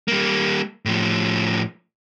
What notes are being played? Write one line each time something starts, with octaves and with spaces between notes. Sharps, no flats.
G3 A#3
A2 F3